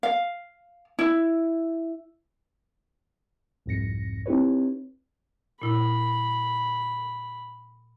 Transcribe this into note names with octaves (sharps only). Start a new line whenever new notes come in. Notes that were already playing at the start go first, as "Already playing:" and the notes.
F5
E4
C2 F2 G#2 A#6 C#7
C4 D#4 E4 G4 B4 C#5
A#2 E4 B5